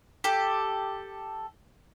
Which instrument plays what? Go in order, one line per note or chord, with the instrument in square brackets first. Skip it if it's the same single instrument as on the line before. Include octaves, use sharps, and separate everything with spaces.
[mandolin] G4 A4